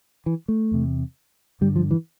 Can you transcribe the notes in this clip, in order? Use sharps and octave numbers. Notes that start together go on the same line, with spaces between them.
E3
A3
E2 C3
G2 D3 G3
F3
E3